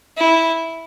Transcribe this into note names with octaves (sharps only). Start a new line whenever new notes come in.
E4